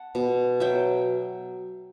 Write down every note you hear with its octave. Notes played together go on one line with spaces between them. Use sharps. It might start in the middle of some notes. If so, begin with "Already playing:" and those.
Already playing: F#5 A5
B2
F#3 E5 G5